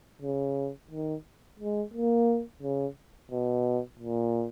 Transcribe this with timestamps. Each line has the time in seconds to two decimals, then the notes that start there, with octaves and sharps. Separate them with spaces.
0.22 C#3
0.91 D#3
1.59 G#3
1.94 A#3
2.62 C#3
3.32 B2
3.99 A#2